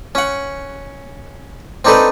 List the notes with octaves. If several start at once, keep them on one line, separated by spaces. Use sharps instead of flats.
C#4 F#5
C4 D4 D#4 A4 B4